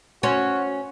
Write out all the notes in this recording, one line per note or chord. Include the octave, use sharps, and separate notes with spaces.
C#4 F#4 C5